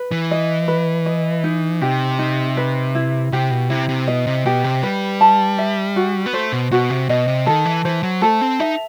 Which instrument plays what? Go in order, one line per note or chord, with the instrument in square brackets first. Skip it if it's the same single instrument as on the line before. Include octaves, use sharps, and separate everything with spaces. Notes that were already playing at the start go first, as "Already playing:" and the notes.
Already playing: [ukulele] B4
[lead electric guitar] E3
[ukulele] D#5
B4
D#5
D#4
[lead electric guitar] C3 [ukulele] G4
[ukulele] D#4
B4
E4
[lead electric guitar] C3 [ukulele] G4
[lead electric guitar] B2
[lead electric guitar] C3 [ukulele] E4
[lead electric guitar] C3
[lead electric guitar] B2 [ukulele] D#5
[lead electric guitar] C3
[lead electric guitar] B2 [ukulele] G4
[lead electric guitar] C3
[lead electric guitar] G3 [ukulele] B4
[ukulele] A5
E5
F#4
[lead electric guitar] B3
[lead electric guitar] A3 [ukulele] C5
[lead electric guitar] B2
[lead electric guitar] B2 [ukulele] F#4
[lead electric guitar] C3
[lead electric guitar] B2 [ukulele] D#5
[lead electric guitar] C3
[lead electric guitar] D#3 [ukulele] A4
[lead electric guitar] E3
[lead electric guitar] E3 [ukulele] C5
[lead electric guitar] F#3
[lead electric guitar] A3 [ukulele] A4
[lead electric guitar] C4
[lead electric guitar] D#4 [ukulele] E5